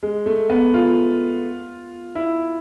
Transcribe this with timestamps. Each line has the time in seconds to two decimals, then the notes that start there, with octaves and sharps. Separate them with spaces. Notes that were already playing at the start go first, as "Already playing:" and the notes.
0.03 G#3
0.26 A3
0.50 B3
0.74 F4
2.15 E4